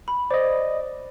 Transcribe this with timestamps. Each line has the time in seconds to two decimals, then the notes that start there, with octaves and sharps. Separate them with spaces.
0.08 B5
0.31 C5 D5 D#5